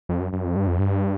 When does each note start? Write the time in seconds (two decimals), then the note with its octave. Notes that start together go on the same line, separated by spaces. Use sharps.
0.09 F2
0.20 F#2
0.33 F#2
0.44 F2
0.56 G2
0.67 F2
0.79 G2